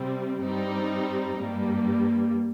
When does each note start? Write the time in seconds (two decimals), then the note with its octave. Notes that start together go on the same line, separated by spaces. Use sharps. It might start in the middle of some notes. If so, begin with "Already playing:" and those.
Already playing: C3 G3 C4
0.43 G2 G3 C4 D#4
1.38 G2 G3 A#3